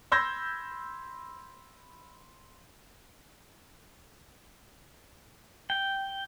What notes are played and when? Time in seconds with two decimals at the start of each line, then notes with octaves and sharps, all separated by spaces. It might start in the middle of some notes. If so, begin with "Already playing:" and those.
0.12 B5 C6 E6 G6 G#6 A#6
5.70 G5